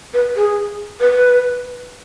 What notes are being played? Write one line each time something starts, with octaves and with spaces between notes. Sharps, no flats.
B4
G#4
B4